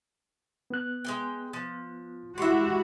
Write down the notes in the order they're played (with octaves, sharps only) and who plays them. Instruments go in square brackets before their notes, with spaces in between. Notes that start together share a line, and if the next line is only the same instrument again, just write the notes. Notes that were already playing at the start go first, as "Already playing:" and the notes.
[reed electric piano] B3 F#6
[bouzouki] G#3 A#3 G5
F3
[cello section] G#3 E4 F#4 [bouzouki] G4 E5 [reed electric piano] C6 C#6